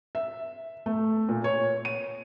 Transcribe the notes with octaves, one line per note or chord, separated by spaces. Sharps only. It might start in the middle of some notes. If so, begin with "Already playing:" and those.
E5
A3
A#2
C#5
D#7